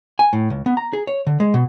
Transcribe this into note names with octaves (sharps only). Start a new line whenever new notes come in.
G#5
A2
C#2
B3
A#5
G#4
C#5
D3
G#3
B2